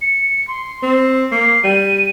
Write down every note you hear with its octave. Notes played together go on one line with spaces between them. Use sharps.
C#7
C6
C4
A#3 C7
G3 D#7